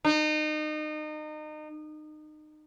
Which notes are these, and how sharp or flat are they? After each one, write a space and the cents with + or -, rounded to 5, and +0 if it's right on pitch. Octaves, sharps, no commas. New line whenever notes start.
D#4 -30